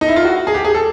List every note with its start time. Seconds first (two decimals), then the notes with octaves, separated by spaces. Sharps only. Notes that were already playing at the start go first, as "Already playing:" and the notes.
0.01 D#4
0.08 E4
0.16 F4
0.24 F#4
0.47 G#4
0.54 G4
0.65 G#4
0.74 A4